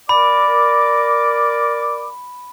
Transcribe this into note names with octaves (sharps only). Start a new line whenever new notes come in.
A#4 D5 B5 D6